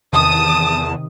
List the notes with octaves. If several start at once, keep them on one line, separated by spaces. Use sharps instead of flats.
E2 C3 D#3 A5 D#6